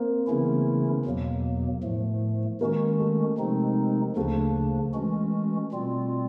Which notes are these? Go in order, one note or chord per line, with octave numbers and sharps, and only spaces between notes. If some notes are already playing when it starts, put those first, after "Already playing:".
Already playing: A#3 C4
C#3 E3 A3 B3 C#4 E4
E2 B2 F#3 A#3
A2 F3 A3
D#3 G#3 A#3 C#4 F#4
A3
C3 F3 G#3 C4 D#4
D2 C#3 F3 A3 A#3 D4
E3 G#3 C#4 F#4
B2 G3 C4 F4